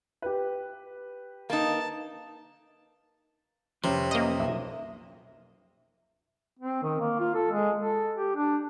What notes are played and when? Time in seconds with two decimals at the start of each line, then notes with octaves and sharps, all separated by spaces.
0.22 G4 B4
1.50 A#3 D#4 A5
3.84 F2 C3 F3 C#4 B4
4.11 A#3 D#5
4.40 B1 E5
6.59 C4
6.82 D#3
7.00 A#3
7.19 F4
7.34 A4
7.51 G#3
7.78 A4
8.16 G4
8.35 D4